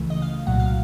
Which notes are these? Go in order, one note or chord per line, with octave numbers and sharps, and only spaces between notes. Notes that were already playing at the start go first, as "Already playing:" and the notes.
Already playing: C#2 C#3 E3 A3
D#5
F5
C2 A#2 F#3 F#5
F5